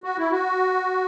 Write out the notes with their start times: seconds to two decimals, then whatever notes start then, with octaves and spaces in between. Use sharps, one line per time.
0.04 F#4
0.18 E4
0.32 F#4